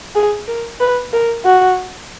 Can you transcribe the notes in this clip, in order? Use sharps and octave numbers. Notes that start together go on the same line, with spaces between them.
G#4
A#4
B4
A#4
F#4